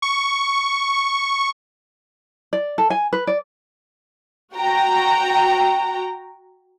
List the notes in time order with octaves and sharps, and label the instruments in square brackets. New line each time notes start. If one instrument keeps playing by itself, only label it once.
[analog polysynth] C#6
[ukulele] D5
A4
G#5
B4
D5
[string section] F#4 G5 A#5